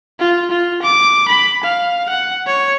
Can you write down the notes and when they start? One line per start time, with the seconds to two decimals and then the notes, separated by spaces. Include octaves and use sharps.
0.19 F4
0.51 F4
0.83 D6
1.28 B5
1.64 F5
2.10 F#5
2.47 C#5